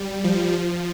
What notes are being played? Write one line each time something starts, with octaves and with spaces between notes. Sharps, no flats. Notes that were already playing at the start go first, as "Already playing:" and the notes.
Already playing: G3
F3
F3